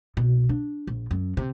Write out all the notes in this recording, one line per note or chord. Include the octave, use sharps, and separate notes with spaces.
C2 B2
D4
A#1
F#2
C3